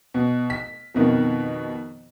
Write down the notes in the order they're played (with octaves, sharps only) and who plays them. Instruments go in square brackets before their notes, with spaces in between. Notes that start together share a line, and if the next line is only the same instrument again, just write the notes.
[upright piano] B2
B6
F2 B2 D#3